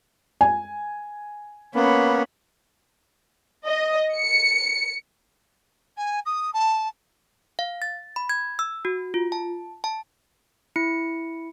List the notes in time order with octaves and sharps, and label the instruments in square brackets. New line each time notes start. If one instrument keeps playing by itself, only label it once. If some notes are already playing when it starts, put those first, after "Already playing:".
[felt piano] G#5
[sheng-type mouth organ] A#3 B3 [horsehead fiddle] C#4 B5
[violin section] D#5
C#7
[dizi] G#5
D#6
A5
[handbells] F5
A6
B5
G#6
E6
F#4
F4
A5
A5
E4 C#7